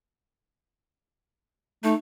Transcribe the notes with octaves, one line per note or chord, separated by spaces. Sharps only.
A3 D#4